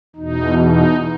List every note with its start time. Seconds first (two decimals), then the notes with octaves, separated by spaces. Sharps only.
0.16 E2 B2 D#4
0.58 D#4